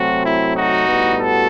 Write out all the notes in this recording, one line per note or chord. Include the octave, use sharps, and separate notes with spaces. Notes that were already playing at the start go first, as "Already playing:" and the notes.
Already playing: C3 F#3 A3 C4 F#4
E4
D#4 F#4
A2 G3 B3
F#4 A4